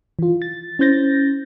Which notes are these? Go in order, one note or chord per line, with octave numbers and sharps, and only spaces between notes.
E3 F4
A6
C#4 E4 C5 G6 A6 A#6